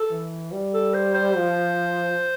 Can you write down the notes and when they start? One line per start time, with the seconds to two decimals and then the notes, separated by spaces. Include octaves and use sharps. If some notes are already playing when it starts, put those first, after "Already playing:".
Already playing: A4
0.11 E3
0.52 G3
0.74 A4
0.94 C5
1.14 C5
1.36 F3